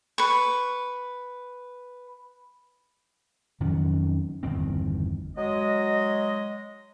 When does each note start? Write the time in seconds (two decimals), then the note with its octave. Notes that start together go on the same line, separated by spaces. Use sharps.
0.18 B4 C#6
3.60 F2 D#3 F#3 C#4
4.43 G1 E2 D#3 C4
5.37 F#3 G#3 D#5